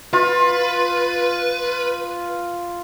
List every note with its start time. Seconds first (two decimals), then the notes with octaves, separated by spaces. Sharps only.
0.13 F4 B4